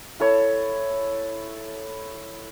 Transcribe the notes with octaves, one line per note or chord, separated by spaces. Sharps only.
E4 A4 C#5